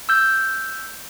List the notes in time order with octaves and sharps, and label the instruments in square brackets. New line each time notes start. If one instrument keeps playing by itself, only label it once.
[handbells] E6 G6